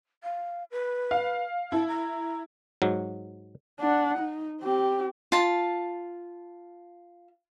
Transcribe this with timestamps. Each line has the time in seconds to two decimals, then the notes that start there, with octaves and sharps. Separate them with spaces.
0.23 F5
0.71 B4
1.11 F5
1.72 E4 A5
1.88 A#5
2.82 G#2 F#3
3.81 D4 F#5
4.18 D#4
4.62 C4 G4
5.32 F4 A5